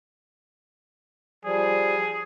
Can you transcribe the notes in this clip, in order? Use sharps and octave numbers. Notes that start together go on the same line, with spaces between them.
F3 G3 G#4